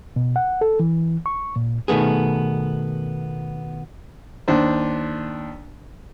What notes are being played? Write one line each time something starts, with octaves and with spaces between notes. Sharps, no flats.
B2
F#5
A4
E3
C#6
A#2
B2 D#3 A3 B3 G#4
D#2 D4 C5